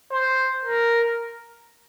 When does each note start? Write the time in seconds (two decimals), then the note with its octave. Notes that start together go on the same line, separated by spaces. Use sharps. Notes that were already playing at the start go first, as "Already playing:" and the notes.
0.12 C5
0.65 A#4